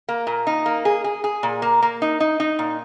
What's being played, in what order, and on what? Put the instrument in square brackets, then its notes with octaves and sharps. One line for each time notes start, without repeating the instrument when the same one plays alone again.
[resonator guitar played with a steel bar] A#3
A#2
D#4
A#3
G#4
G#4
G#4
A#2
A#3
A#3
D#4
D#4
D#4
A#2